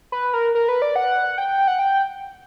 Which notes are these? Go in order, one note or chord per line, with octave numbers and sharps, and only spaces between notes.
B4
A#4
A#4
B4
D5
F#5
G5
F#5
G5